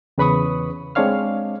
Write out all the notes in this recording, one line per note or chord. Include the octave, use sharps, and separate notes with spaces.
E2 C#3 B4 B5 C#6 D#6
G#3 C4 D4 C#5 F5 F6